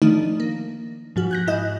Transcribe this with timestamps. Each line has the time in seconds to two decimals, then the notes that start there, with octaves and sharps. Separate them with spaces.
0.02 D#3 F3 A3 D4 D#4
0.40 A#3
1.16 G#2 F3 F#4
1.31 F#6 G6 A#6
1.47 G#2 E4 D#5 F#6